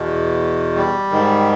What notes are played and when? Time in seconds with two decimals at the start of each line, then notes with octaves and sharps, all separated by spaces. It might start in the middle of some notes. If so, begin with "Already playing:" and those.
Already playing: E2 B2
0.76 G3
1.11 G#2 D#3